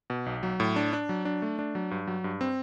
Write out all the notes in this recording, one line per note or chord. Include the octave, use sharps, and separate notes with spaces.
B2
B1
F#3
A2
D4
D4
F#3
D4
A3
D4
F#3
G2
F#3
G2
C4